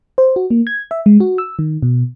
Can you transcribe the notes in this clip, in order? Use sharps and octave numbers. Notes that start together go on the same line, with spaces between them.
C5
F#4
A#3
G#6
E5
G#3
F#4
E6
D#3
B2